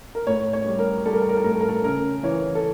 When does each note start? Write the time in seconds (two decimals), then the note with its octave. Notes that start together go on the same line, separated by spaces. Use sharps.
0.15 A#4
0.27 A2 C#5
0.53 C#5
0.66 G3
0.79 A#4
1.06 G3 A4
1.13 A#4
1.22 A4
1.29 A#4
1.37 A4
1.44 A2 A#4
1.53 A4
1.61 A#4
1.69 A4
1.84 C#3 A#4
2.23 E3 C#5
2.55 A4